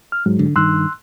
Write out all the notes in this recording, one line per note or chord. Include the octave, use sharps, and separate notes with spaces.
F6
G#2 F#3 G#3
D3
G2 D#3 C6 E6 F#6